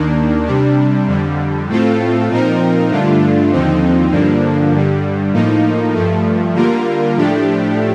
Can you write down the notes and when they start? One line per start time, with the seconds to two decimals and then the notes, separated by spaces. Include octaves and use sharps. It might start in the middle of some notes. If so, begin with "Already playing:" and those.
Already playing: D#2 D#3 A#3 D4
0.46 C3 G3 D4
1.07 F2 D3 G3
1.68 A2 A3 C4 F4 A4
2.29 A#2 F3 C4 D#4 A#4
2.89 G2 D3 A3 D4 F4
3.51 D#2 D3 F3 C4 D#4
4.11 G2 D3 F3 A#3 D4
4.71 G2 D3 G3
5.33 A2 F3 A#3 D#4
5.93 G2 F3 A3
6.54 D3 G3 A#3 F4 A#4
7.16 A2 F3 A3 D4 G4